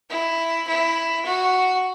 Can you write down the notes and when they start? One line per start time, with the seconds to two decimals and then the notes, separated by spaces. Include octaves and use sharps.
0.10 E4
0.67 E4
1.25 F#4